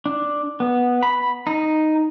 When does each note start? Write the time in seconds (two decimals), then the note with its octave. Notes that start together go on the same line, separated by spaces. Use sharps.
0.06 D4
0.60 B3
1.03 B5
1.47 D#4